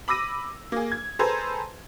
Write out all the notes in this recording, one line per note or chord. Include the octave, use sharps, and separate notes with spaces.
B5 D6 E6 A#6 D#7
A#3 G#4
G#6
G#4 A4 B4 C5 A#5 G#6